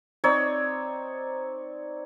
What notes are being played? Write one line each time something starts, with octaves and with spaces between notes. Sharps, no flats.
C4 D#4 C#5 D5